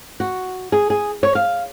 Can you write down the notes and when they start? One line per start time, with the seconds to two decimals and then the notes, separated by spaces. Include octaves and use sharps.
0.20 F#4
0.72 G#4
0.90 G#4
1.23 C#5
1.35 F5